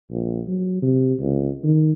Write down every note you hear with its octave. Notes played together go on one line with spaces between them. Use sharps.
A#1
F#3
C3
C#2
D#3